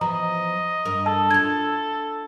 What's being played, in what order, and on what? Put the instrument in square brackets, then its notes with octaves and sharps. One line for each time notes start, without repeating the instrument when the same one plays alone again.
[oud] E2 F3 B4 [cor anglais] D#5 [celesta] A#5
[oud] G2 A#4
[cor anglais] A4 [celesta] A5
[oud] D4 F4 [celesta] G#6